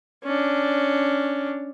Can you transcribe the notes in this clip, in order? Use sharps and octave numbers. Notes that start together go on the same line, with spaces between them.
C#4 D4